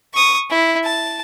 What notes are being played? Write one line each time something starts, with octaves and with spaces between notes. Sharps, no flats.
C#6 D#6
E4
A5